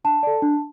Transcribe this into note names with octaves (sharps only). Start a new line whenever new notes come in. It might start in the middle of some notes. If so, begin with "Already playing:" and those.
D4 A5
A4 D5
D4